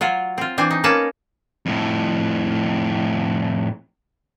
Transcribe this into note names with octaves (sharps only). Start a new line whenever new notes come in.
F#3 F4 F#4
C4 F4
E3 C4 D4 C5 G#5
D#4
A#3 C#4 B4 C#5 A5
F2 A2